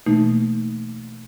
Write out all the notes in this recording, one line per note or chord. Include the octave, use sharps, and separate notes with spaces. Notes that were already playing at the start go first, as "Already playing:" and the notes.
B2 E3 A3 A#3 D#4